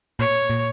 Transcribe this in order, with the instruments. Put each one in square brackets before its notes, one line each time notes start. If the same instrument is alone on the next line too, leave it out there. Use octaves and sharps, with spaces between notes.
[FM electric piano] A#2 [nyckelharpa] C#5
[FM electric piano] A#2